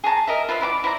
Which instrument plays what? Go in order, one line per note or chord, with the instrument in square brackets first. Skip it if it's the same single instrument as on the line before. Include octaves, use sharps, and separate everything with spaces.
[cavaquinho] G#4 C#5 A5 A#5
A#4 D#5 E5
F4 B4 C5 E5
E4 D5 G5 D6
E4 C5 D5 A#5